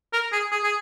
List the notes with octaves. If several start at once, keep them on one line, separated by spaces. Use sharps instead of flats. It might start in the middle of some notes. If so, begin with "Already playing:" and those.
A#4
G#4
G#4
G#4